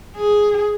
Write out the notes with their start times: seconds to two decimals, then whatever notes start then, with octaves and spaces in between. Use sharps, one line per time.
0.16 G#4